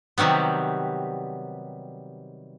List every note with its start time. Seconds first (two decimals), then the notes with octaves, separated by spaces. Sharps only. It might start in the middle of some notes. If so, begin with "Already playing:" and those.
0.18 C3 D#3 F#3 G3 B3